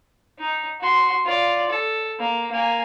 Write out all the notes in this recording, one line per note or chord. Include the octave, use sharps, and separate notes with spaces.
D#4
F#4 C6
F4 D5
A4
A#3
A#3 G#5